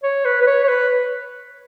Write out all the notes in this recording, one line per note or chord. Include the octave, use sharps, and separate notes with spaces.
C#5
B4
B4
C#5
C#5
B4